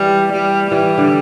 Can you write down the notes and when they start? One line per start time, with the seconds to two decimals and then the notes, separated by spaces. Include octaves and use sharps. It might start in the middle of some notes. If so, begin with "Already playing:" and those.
Already playing: E3 G3
0.32 G3
0.71 E3 G3
0.98 D3